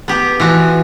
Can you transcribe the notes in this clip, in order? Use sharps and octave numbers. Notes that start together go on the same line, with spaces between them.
B3 G4
E3 F3 F#4